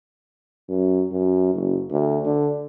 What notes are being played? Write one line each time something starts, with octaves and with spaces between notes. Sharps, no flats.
F#2
F#2
F#1
D2
D3